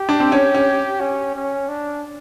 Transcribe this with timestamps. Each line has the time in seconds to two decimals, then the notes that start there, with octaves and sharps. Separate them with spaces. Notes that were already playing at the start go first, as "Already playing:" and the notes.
Already playing: G4
0.09 D4
0.20 C4
0.32 C#4
0.54 C#4
1.01 C#4
1.35 C#4
1.69 D4